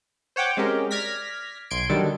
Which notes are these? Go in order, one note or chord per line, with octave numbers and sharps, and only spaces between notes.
C5 C#5 F#5 G5 D6
G#3 C4 C#4 G4 A#4
D5 F6 G#6 A#6 B6
B1 C6 G#6 D7
D3 D#3 F#3 G3 A4